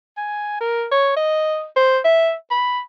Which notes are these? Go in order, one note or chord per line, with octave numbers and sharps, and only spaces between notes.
G#5
A#4
C#5
D#5
C5
E5
B5